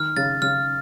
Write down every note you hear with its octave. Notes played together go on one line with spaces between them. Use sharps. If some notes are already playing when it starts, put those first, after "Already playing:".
Already playing: D#3 F6
C#3 A6
C#3 F6